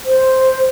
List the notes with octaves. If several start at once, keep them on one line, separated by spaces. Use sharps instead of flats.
C5